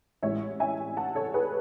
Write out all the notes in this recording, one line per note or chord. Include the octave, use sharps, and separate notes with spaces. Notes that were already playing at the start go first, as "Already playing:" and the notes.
A1 A2 G#3 C#4 C#5 E5
E5 G#5
F#5 A5
A4 C#5
G#4 B4